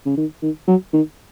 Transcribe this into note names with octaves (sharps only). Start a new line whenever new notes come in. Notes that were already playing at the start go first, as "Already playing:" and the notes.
C#3
D#3
D#3
F#3
D#3